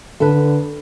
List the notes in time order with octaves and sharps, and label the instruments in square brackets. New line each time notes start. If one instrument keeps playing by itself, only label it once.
[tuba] D3 [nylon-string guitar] A4 B4